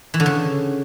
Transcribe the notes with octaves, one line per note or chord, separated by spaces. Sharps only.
E3
D3
C#3